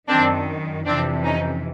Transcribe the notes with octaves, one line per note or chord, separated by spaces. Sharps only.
F#2 D#3 C4 D4
F2 C3 E3 C4 D4
C#4 D#4